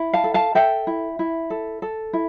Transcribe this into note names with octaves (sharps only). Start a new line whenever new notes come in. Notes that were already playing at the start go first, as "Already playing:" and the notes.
Already playing: E4
F5 A5
A4
F5 A5
A4 E5 G5
E4
E4
A4
A4
E4